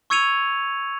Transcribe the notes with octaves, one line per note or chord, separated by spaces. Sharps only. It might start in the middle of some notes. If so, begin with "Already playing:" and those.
C#6 E6 G#6 C#7 D#7 F7